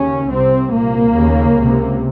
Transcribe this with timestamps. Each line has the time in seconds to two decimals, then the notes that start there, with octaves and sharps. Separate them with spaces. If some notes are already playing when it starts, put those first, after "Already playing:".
Already playing: D#2 C#3 C#4
0.31 C2 C3 C4
0.73 C2 A#2 A#3
1.15 D#2 C#3
1.57 C#2 C3